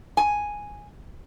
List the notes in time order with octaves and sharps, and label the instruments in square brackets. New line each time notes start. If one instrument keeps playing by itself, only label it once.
[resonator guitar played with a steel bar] G#5